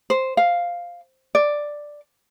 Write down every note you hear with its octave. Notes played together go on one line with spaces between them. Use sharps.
C5
F5
D5